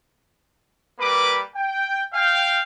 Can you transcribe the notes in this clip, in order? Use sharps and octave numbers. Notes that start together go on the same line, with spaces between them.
G3 A#3 B4 B5 D6
G5
F5 G5